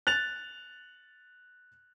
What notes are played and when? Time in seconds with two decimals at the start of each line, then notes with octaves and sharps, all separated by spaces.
0.07 F#6 A6 F7